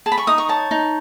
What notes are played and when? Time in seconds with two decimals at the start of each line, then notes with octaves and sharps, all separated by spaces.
0.06 G#4 A5
0.12 B5
0.18 C#6
0.27 D#4 D#6
0.38 C#6
0.49 C#5 A5
0.71 D#4